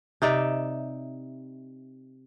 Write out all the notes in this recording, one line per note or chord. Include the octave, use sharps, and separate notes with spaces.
C3 D#4 D5 E5